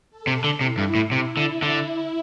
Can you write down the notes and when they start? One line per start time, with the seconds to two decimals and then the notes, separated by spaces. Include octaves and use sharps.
0.10 A4
0.27 C3
0.44 D3
0.61 C3 E4
0.78 G2
0.95 A2
1.12 C3 E4
1.37 D3
1.62 D3